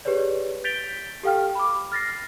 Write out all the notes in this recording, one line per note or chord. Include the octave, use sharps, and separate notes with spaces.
G4 G#4 B4 C#5 D5
G6 A6 B6 D7 F7 G7
G4 A4 F5 G5 F6
B5 D6
F6 A6 A#6 C7